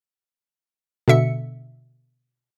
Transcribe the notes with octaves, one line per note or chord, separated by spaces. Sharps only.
B2 D3 E5 C#7